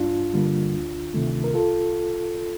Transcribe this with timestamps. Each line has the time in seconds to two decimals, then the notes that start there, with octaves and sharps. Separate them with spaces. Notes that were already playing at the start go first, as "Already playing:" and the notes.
Already playing: G2 D4 F4
0.34 D3 G3 A#3
0.73 D2
1.14 C3 D#3 A3
1.44 A#4
1.54 C2 F4 A4